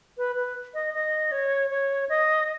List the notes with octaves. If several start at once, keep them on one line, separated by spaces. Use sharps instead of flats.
B4
B4
D#5
D#5
C#5
C#5
D#5